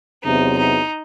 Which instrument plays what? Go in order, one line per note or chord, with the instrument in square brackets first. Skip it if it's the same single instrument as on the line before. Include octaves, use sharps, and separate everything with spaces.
[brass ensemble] E2 C3 F#3 B3 [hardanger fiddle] D#4
[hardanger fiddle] D#4